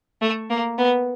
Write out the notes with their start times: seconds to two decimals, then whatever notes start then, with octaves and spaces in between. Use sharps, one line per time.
0.22 A3
0.50 A#3
0.78 B3